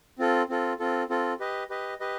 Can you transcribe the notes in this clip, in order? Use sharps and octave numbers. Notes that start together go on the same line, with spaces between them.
C4 F4 A4
C4 F4 A4
C4 F4 A4
C4 F4 A4
G4 B4 D#5
G4 B4 D#5
G4 B4 D#5